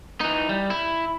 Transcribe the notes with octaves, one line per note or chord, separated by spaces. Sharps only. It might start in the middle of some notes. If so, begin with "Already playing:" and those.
E3 D#4
G3
E4